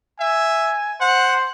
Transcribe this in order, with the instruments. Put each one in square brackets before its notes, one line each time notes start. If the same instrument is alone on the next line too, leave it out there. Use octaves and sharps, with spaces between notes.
[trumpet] E5 [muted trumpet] G#5
[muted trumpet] C5 [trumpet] F#5